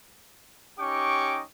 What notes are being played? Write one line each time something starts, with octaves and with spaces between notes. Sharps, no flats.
C#4 D#4 G4 G5 C#6 D6